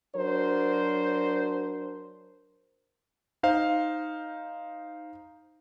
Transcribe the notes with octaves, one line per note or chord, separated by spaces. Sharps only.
F#3 D4 A#4 C5
D#4 C5 F5